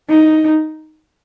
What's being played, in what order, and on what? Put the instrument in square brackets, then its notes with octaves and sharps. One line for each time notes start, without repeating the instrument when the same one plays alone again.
[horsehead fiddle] D#4